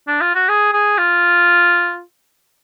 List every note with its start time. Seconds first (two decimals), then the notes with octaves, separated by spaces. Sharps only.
0.07 D4
0.21 F4
0.35 F#4
0.49 G#4
0.73 G#4
0.98 F4